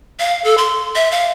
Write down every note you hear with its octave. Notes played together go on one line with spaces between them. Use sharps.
F5
A4
C6
E5
F5